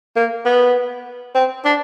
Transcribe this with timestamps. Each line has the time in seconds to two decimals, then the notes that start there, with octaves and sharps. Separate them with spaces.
0.16 A#3
0.45 B3
1.35 C4
1.65 D4